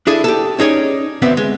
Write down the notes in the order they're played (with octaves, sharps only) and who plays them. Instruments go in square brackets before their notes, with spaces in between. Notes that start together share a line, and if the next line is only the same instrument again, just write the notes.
[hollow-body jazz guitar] D4 E4 G#4 A4
G4 A4
C#4 D#4 G#4 C#5 D5
D2 B3 C4 E5
G#3